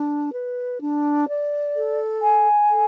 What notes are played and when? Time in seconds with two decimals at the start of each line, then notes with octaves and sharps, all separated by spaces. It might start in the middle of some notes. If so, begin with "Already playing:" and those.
Already playing: D4
0.32 B4
0.81 D4
1.27 D5
1.75 A4
2.22 G#5
2.69 A4